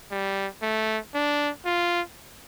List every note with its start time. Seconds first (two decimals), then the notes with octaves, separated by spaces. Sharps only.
0.11 G3
0.62 A3
1.14 D4
1.65 F4